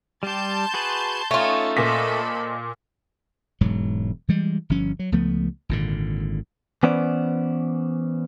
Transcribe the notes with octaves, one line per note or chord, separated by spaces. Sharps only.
G3 G4 A5 C6 G6
F#4 G#4 B4
A3 C#4 D#4 F4 A4 C#5
A#2 A4 C5 D#5 B5 B6
E1 G#2 F#3
E3 G3 G#3
G1 F3 C#4
F#3
C#2 F3 A3 B3
G#1 A#2 D3
E3 B3 C#4 C5 D5